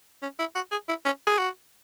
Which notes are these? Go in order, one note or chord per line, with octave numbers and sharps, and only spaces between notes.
C#4
E4
F#4
G#4
E4
C#4
G#4
F#4